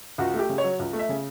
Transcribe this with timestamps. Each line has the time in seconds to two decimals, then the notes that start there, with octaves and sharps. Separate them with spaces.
0.18 C#2 F#4
0.34 A3
0.39 G4
0.49 C#3
0.58 C#5
0.64 F#3
0.79 C#2
0.93 A3
0.99 E5
1.09 C#3